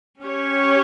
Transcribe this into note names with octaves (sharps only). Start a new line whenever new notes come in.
C#4 G4 C#5